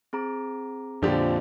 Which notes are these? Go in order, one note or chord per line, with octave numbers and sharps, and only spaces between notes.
C4 G#4 A#5
F2 A#2 D3 F3 D4 G4